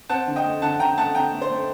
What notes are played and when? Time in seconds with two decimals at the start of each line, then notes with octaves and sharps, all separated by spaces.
0.09 C4 F#5 A5
0.27 D3
0.36 D#5 G5
0.45 A3
0.62 D3 F#5 A5
0.80 D3 G5 A#5
0.97 A3 F#5 A5
1.15 D3 G5 A#5
1.33 A3
1.42 C5
1.50 A3